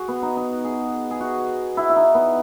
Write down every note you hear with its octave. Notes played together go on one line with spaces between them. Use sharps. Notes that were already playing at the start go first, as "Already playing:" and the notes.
Already playing: F#4 G#4
B3
D#4
D#4
G#4
G#4
F#4
E4
E4
D#4
B3